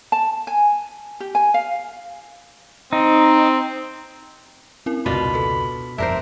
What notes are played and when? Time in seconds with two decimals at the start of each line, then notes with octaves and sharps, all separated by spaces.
0.12 A5
0.47 G#5
1.20 G4
1.35 G#5
1.54 F5
2.93 C4 D#4
4.86 C4 C#4 E4 A#4
5.06 F1 C#2 B2 D4 F4 D5 B5 D#7
5.34 A4 B4
5.98 G1 F2 D4 A#4 C5 E5